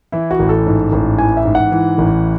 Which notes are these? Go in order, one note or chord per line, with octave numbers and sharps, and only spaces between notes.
E3 E4
F#4
A1
A4
G#2
A1
E3 G#5
E5
G#2
F#5
E3
A1